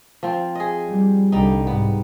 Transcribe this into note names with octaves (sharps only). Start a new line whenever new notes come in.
F3 C4
G#4 D#5
G3
C2 D3 G3 D#4
G#2 B3